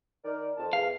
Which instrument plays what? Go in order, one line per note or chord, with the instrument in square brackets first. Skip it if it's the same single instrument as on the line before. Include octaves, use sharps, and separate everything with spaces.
[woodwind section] D#3 A#4 D5
F2 A5
[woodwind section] E2 [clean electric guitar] F5